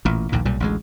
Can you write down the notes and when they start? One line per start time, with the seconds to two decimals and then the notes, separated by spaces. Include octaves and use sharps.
0.05 A1 A#2
0.32 A#1 D#2 A2
0.45 B1 A#2 G3
0.60 A1 D2 F#3 G#3